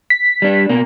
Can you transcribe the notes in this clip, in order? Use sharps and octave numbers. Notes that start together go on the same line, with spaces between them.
B6
G3 D4
B2 A#3